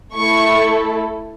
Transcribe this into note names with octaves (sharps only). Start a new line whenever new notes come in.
A3 E4 A4 C#6